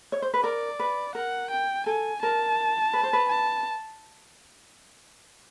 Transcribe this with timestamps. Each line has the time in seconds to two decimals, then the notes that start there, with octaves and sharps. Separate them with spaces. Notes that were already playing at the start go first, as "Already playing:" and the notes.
0.12 C#5
0.22 C5
0.34 B4
0.43 A#4 D5
0.80 B4
1.15 A#4 F#5
1.51 G5
1.86 A4 G#5
2.22 A#4 A5
2.93 B4
3.03 C5
3.13 B4
3.29 A5